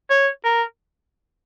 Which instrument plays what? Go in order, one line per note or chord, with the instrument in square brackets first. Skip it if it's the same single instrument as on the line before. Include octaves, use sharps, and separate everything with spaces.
[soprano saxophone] C#5
A#4